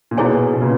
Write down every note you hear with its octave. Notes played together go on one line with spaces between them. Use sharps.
A#2
B2 E4 G#4 C#5 G#5
B2
A#2 C#3